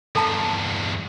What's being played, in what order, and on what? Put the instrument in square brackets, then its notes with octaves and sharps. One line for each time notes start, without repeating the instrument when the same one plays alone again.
[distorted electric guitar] E2 G2 [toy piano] A4 A5 A#5